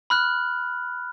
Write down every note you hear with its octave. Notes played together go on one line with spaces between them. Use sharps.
B5 F6 F#6